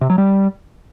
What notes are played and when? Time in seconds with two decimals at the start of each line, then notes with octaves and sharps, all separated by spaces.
0.01 C3
0.10 F#3
0.18 G3